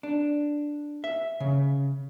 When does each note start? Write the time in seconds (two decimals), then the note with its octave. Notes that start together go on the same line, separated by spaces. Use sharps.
0.03 D4
1.04 E5
1.40 C#3